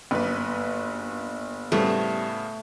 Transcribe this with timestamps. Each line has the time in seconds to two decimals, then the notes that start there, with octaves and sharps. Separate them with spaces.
0.11 G1 F#2 A#3 B4
1.72 A2 C#3 G3 A3 B3 C4